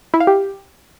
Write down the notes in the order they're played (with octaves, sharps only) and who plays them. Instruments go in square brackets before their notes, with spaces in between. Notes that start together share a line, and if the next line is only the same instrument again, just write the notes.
[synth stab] E4
F5
G4